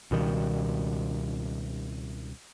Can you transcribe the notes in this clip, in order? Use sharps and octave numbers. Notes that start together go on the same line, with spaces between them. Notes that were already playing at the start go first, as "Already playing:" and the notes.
C#2 B2 D#3 G3